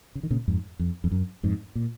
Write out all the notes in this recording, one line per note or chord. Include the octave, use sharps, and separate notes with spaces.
C#3
D#3
A#2 C#3
F2 G#2
F2
F2
F#2
F2 G#2
A#2